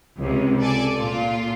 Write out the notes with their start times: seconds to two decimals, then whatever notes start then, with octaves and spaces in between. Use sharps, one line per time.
0.18 C#2 C3
0.60 A4 D5 G#5
0.96 A#2 F4